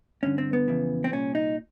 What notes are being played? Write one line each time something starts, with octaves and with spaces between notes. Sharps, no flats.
G2 D3 C#4
C4
B3
F2 C#3 E3
C4
C2 A#2 C#4
D#4